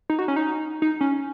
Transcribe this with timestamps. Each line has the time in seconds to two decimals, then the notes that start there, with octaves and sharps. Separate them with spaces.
0.10 D#4
0.19 F#4
0.28 C#4
0.36 D#4
0.82 D#4
1.01 C#4